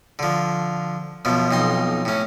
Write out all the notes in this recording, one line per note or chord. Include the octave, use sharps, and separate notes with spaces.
D3 F3
F#2 B2 F3
B1 F2 D#4 C6
A2 C#4